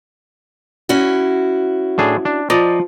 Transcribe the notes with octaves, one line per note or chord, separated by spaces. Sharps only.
C#4 E4 F#4
A2 D4 G#4
D4
F3 D5 D#5 A#5